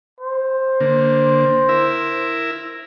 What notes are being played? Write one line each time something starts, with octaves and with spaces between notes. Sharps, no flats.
C5
D3 A#3
E4 A#4 E5